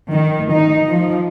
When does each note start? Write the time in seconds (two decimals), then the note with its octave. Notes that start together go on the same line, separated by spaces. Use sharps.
0.11 D#3
0.52 D#4
0.87 F3